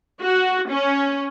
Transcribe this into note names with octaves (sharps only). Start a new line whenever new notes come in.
F#4
C#4